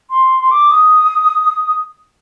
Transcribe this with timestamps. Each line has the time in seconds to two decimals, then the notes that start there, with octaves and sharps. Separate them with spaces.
0.10 C6
0.40 C6
0.51 D6
0.71 D#6